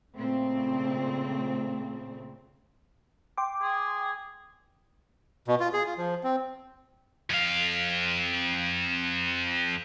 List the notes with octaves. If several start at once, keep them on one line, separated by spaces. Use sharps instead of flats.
A#2 C#3 A3 C4
G5 C6 D6
G#4
B2
F4
G#4
F4
F3
C4
F2 F5